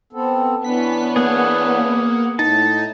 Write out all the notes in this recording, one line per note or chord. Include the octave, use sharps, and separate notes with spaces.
B3 C4 A4
E3 B3 C#4 D4 B6
A#3 G#4 F#5
A2 D#4 A5